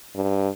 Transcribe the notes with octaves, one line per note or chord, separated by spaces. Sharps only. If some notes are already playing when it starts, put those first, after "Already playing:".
G2